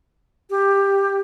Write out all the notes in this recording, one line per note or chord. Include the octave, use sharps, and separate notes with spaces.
G4